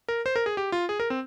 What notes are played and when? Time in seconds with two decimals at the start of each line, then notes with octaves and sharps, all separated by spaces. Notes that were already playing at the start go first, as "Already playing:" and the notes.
0.09 A#4
0.26 C5
0.36 A#4
0.46 G#4
0.57 G4
0.72 F4
0.89 G#4
1.00 A#4
1.10 C4